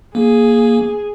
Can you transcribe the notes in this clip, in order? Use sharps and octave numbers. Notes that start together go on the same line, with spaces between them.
A#3 G#4